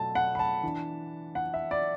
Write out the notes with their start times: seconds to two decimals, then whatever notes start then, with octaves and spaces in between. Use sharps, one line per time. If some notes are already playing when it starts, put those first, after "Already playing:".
Already playing: B2 F#3 A3 A5
0.15 F#5
0.35 B5
0.39 A5
0.63 E3 D4
1.35 F#5
1.54 E5
1.71 D5